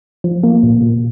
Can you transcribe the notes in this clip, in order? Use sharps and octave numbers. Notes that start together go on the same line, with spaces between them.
F3
A#3
A#2
A#2